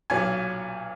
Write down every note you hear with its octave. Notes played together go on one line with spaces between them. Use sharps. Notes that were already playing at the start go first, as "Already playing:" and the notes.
B1 A#2 F#3 G#5